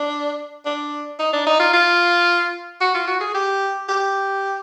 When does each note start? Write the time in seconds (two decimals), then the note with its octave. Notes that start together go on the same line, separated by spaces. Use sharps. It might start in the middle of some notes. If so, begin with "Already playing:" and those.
Already playing: D4
0.65 D4
1.19 D#4
1.33 D4
1.47 D#4
1.60 F4
1.73 F4
2.81 F#4
2.94 F4
3.07 F#4
3.21 G#4
3.34 G4
3.89 G4